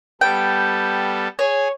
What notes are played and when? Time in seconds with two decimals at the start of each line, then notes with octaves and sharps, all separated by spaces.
0.21 G3 B3 A4 G5
1.39 G#4 C#5 G#5